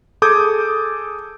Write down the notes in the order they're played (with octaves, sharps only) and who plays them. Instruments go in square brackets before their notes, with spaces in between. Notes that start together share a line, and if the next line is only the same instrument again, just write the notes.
[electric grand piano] G#4 A4 D6 D#6 G6 G#6